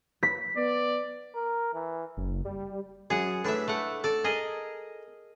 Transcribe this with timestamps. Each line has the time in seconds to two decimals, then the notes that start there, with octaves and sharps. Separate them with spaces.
0.23 B6
0.57 B3 D5
1.35 A#4
1.74 E3
2.17 F#1
2.45 G3
3.10 F#2 G#4 F#5
3.44 A2 D4 B4 E5
3.68 A3 F#5
4.04 A4 D5 A5
4.24 G#4 A#4 D#5